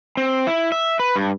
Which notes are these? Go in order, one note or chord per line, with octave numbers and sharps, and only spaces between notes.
C4
E4
E5
B4
G2